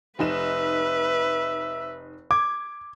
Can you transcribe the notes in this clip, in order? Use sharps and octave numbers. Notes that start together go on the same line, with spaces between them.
F1 D#4 B4 E5 E7
D6 G#6